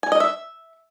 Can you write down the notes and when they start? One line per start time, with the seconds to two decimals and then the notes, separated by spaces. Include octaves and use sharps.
0.03 G#5
0.12 D#5
0.20 E5